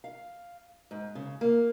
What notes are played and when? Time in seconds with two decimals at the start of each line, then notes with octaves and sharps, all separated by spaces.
0.04 F5
0.91 G#2
1.15 C#3
1.41 A#3